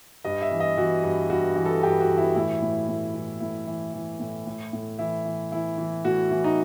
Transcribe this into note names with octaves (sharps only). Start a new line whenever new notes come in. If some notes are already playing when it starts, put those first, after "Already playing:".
G2 D#5
E5
E3
D#5
E3 F#4
G2
G2 F#4
E3
A4
G2 G4
F#4
E3
E4
A2 E4
A2
A2
E3
A2 E4
E3
E3
A2
A2
A2
E3 E4
E3
E3 E4
E3
A2 F#4
E3
D#4